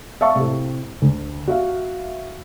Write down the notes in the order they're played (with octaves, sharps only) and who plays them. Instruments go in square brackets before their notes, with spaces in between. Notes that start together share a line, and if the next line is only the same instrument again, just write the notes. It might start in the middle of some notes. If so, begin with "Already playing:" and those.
[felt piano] E5 F5 A5 C#6 E6
A2 C3
D2
F#4 E5 F5